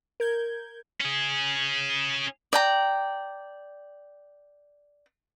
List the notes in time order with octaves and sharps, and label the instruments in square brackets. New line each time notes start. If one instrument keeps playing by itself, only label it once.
[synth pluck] A#4 G6 G#6
[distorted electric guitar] C#4 G#4
[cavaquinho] D5 G5 A#5